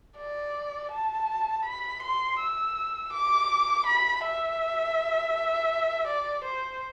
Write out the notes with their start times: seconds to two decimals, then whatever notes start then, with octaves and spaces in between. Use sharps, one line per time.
0.17 D5
0.92 A5
1.65 B5
2.03 C6
2.39 E6
3.13 D6
3.86 B5
4.24 E5
6.07 D5
6.45 C5